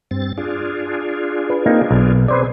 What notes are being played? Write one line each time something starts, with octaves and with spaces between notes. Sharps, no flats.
G2 C4 A6
D4 F4 G#4
B4
A#3 C4 D#4
B1
C4 G#4 B4 C5 D5